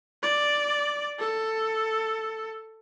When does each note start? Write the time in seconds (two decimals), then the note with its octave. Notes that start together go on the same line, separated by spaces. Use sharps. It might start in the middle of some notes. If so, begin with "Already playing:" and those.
0.23 D5
1.20 A4